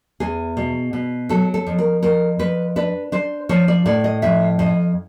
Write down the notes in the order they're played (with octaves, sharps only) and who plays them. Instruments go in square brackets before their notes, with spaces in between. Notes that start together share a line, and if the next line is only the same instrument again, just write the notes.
[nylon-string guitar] E2 G#4
B2
B2
F#3 A4
A4
F2
A#4
F2 A#4
F2 B4
D4 B4
D4 C5
F3 C#5
D5
A2 D5
D#5
F2 E5
F2 D#5